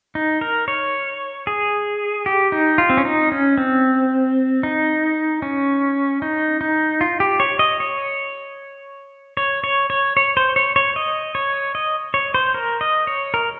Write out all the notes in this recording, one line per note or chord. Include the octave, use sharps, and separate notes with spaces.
D#4
A#4
C#5
G#4
G4
D#4
F4
C4
C#4
D#4
C#4
C4
D#4
C#4
D#4
D#4
F4
G4
C#5
D#5
C#5
C#5
C#5
C#5
C#5
C5
C#5
C#5
D#5
C#5
D#5
C#5
C5
A#4
D#5
C#5
A#4